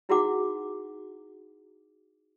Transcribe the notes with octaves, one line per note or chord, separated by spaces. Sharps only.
D#4 E4 F#4 G#4 F#5 D6